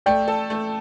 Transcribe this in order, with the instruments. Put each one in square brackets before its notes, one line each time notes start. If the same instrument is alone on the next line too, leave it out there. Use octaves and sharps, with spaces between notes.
[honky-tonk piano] A3 [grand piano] D5 G5
[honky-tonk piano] A4
A3